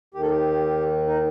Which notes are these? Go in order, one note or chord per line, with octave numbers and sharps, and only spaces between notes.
D#2 D#3 G4
A4
G4
D#4